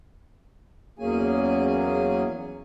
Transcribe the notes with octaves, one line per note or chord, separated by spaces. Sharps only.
E2 F#3 A#3 C#4 G#4 G#5